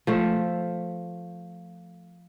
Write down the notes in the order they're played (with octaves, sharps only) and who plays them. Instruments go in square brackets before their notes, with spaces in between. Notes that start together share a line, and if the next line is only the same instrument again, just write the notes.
[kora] F3 A3 E5